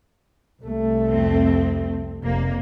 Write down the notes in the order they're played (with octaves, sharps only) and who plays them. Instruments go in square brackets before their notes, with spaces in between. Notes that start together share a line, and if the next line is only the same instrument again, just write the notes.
[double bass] C2 A3
[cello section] F2 C4
[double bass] F1 [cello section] A#3